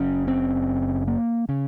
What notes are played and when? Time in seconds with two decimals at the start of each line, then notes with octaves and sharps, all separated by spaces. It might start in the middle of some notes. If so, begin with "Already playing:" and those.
Already playing: F#1 F#2 C#3 C#4
0.28 C4
1.08 A#3
1.49 C#3